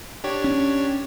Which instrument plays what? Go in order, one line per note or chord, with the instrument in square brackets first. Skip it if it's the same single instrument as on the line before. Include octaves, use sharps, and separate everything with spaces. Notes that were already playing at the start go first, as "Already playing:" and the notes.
[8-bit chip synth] D4 G4 C#5
[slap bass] C#4